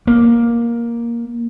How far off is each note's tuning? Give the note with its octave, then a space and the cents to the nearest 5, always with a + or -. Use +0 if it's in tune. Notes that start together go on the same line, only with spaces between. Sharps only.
A#3 +10